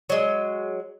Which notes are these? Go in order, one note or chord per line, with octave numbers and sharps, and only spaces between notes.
F#3 G#3